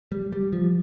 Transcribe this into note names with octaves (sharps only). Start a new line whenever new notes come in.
G3
G3
F3